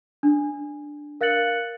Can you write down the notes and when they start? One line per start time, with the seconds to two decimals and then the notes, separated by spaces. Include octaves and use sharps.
0.23 D4
1.21 A#4 F5 F#6 A6 C#7 F#7